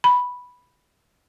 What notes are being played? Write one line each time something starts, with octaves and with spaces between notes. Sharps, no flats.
B5